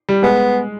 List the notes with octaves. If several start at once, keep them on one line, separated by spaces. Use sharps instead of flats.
G3
G#3 B3